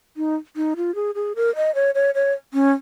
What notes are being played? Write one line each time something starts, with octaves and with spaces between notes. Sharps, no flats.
D#4
D#4
F4
G#4
G#4
A#4
D#5
C#5
C#5
C#5
C#4